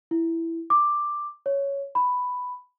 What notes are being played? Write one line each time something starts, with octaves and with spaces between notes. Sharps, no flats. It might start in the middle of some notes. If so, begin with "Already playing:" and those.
E4
D6
C#5
B5